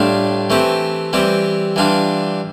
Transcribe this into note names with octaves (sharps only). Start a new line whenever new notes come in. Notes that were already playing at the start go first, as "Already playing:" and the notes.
Already playing: A2 G3 D4 F4
E3 A3 C4 G4
E3 G3 C4 G4
E3 G3 D4 F4